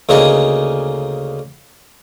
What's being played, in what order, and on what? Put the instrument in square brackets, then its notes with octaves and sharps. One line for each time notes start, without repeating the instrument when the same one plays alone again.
[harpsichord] D2 C#3 A#3 D#4 G#4 D#5